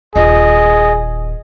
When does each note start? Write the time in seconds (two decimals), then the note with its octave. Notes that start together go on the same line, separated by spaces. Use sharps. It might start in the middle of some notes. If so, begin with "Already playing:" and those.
0.16 D#1 F4 G#4 D#5